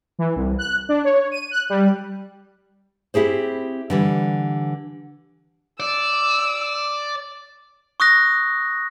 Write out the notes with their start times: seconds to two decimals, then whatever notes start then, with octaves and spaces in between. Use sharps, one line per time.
0.19 E3
0.36 C2
0.59 F#6
0.89 D4
1.04 C#5
1.31 D#7
1.51 F#6
1.70 G3
3.14 C4 E4 G4 G#4 C5
3.90 D3 E3 G3
5.80 D5 E6
8.00 C#6 D#6 F#6 A#6